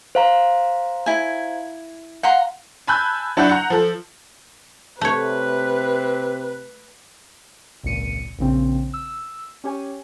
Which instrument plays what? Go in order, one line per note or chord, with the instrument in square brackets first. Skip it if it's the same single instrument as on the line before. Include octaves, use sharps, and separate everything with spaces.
[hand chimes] C5 F5 A#5
[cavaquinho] E4 G#5
[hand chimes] F5 [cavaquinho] F#5 A#5 C6
[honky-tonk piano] G#5 A5 B5 E6 F#6 G6
F#3 D4 E4 F#5 B5 G6
F#5 A#5
F3 A4
[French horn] C3 [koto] A3 C#5 [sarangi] B4
[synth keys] G#1 C#2 A#2 C#7 D#7
A#1 A#2 C#3 C4
E6
C#4 G4 C#5 G#5